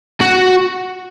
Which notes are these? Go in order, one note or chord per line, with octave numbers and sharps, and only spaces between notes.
F#4